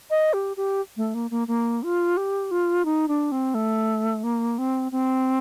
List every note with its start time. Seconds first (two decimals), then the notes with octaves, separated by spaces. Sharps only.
0.10 D#5
0.33 G4
0.57 G4
0.97 A3
1.14 A#3
1.31 A#3
1.48 A#3
1.83 F4
2.17 G4
2.51 F4
2.85 D#4
3.08 D4
3.32 C4
3.54 A3
4.23 A#3
4.58 C4
4.92 C4